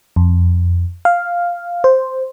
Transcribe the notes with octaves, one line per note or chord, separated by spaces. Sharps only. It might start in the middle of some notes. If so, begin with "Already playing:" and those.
F2
F5
C5